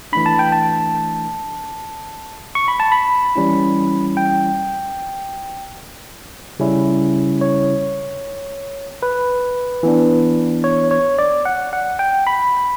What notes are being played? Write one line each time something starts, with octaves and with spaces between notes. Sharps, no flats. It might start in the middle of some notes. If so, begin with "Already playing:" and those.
E3 A3 D4 B5
A5
G5
A5
C#6
B5
A5
B5
E3 G3 C#4 E4
G5
C#3 G3 C#4 E4
C#5
B4
E3 B3 D4
C#5
C#5
D5
F#5
F#5
G5
B5